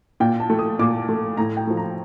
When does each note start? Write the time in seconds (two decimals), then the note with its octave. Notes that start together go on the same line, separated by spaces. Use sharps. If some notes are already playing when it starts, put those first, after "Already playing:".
0.20 A#2 G5
0.40 A5
0.50 A3
0.59 D#6
0.79 A#2 D6
1.09 A3
1.37 A2 A#5
1.57 G5
1.67 F3 A3
1.77 A#5